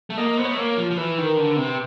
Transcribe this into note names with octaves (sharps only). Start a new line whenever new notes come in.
A3
A#3 D#5
B3 C5
C#5
A3
A#3
F3
F3
E3 B4
D#3
A#4
D3
B4
C3